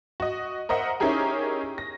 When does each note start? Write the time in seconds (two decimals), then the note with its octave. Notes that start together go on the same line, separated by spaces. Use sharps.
0.20 F#4 D#5
0.69 A#4 C5 D#5 E5 F#5
1.00 C#4 D#4 E4 G4 G#4 A#4
1.78 A#6